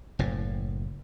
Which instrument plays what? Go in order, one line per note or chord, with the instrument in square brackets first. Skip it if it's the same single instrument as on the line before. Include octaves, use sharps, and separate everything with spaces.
[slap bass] F#1 A2